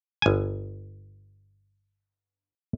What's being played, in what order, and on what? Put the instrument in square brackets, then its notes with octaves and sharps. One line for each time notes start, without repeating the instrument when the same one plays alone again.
[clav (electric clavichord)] G1 G#5